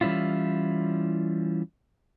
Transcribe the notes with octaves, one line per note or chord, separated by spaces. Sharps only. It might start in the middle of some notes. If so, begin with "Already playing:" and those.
E3 G3 A3 C#4 E4 F4